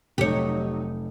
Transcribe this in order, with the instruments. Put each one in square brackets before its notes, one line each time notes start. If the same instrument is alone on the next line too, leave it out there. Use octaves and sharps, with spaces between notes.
[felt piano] F1 [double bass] F#3 D#4 [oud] G4 C#5